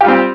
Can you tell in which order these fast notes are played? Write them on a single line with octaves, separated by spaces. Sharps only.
G4 F4 G3 C4